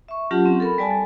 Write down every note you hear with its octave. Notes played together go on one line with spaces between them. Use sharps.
E5 C#6
F#3 C#4 F4 G4 F#5 A5
C4
A4 A#4 B5
G3 D5 G#5 A5
A4